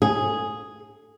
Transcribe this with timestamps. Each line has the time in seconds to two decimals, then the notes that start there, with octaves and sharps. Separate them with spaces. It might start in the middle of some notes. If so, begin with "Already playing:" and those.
0.02 G#4